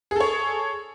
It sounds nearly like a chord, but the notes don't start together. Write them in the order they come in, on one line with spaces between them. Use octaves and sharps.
G#4 A4 C#5